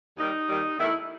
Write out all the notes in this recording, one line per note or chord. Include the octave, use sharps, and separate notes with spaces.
D#2 D#3 G3 D#4
D#2 D#3 G3
E2 D#3 A3 E4